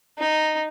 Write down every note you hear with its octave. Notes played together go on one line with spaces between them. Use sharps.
D#4